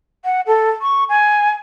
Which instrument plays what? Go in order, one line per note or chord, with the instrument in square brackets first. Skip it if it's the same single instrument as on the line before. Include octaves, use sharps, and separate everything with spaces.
[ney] F#5
A4
C#6
G#5